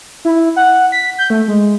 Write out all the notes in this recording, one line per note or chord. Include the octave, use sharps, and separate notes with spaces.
E4
F#5
B6
G6
A3
G#3